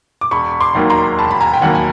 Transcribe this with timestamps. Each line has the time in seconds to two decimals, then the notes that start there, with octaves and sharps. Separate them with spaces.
0.21 D6
0.31 E1 B5 C#6
0.61 C6 D6
0.75 D#2 D#3 F#3 A#3
0.90 A#5 C6
1.18 E1 A5 B5
1.31 B5
1.41 G#5 A#5
1.54 G5
1.62 D#2 D#3 F#3 A#3 F#5 G#5
1.75 G#5